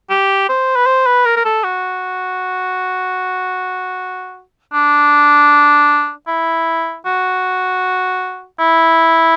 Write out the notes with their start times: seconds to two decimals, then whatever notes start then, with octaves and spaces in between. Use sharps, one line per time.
0.10 G4
0.49 C5
0.76 B4
0.86 C5
1.06 B4
1.26 A#4
1.37 A#4
1.45 A4
1.64 F#4
4.73 D4
6.27 E4
7.06 F#4
8.59 E4